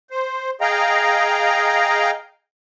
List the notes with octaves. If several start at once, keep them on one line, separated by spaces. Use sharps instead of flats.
C5
G#4 D#5 F5 G5 A#5